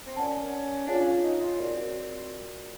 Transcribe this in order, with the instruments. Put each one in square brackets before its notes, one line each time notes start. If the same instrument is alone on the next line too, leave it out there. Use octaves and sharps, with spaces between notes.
[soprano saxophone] C4
[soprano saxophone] C#4 [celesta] A#4 D5 F#5 A5
[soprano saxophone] D4 [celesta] F4 G#4 C#5 F5 G#5
[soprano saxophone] C#4
D#4
F4
[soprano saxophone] C4 [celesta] F#4 A#4 D5